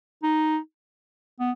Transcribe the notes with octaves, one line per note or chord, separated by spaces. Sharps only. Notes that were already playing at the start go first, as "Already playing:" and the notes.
D#4
B3